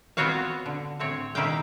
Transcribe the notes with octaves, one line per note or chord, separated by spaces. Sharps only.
B3 C4 F4 F#4 C#5 F5
D3
A2 C4 C#5
B2 D#3 E4 G4 F5 G5